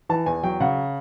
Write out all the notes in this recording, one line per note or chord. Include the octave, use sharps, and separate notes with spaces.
E3 A5
E2 G#5
F#3 G5
C#3 F#5